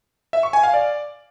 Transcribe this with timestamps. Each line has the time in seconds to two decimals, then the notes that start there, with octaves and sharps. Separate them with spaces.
0.33 E5
0.43 C#6
0.53 G#5
0.63 F5
0.74 D5